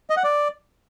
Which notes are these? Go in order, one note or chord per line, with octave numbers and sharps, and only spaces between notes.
D#5
F#5
D5